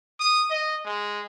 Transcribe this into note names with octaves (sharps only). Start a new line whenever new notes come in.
D#6
D#5
G#3